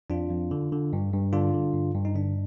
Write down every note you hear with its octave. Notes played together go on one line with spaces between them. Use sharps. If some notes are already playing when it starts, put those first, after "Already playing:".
F2 D4 F4
F2
D3
D3
G2
G2
D3 D4 F4
D3
G2
G2
D#4
D3 D4